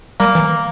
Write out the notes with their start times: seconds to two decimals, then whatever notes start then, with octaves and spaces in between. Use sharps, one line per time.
0.20 G3 A#3
0.35 E3